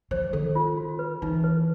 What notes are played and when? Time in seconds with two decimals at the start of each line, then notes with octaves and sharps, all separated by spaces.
0.11 F3 C5
0.33 D#3 A4
0.55 F4
0.77 F#4
0.99 B4
1.22 E3 D#4
1.44 B4